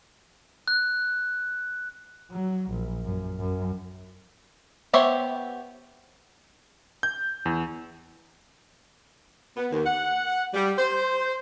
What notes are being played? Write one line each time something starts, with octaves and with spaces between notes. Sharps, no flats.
F#6
F#3
A#1
F#2
F#2
B3 G4 C5 C#5 E5
G6
E2
B3
D#2
F#5
G3
C5